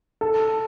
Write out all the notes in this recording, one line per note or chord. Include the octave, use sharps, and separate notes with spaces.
A4